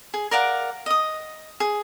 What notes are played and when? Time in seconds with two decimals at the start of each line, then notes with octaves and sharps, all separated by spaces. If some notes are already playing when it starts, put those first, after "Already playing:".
0.14 G#4
0.31 A#4 D5 F5 F#5
0.86 D#5 D#6
1.60 G#4